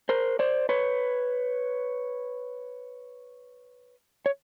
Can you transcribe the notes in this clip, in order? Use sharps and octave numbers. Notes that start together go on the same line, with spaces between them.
A#4 C5
C5 D5
B4 C#5
C#5